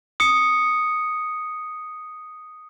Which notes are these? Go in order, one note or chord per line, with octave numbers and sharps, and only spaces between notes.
D#6 C#7